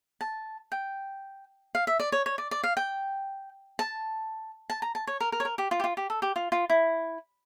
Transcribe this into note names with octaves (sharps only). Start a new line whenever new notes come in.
A5
G5
F5
E5
D5
C#5
C#5
D5
D5
F5
G5
A5
A5
A#5
A5
C#5
A#4
A#4
C#5
A#4
G4
F4
G4
F4
G4
A4
G4
F4
F4
E4